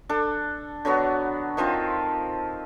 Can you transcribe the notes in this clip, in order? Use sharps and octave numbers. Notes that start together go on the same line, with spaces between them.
D4 A4
D3 F#3 B3 F#4
D#3 F3 C4 F4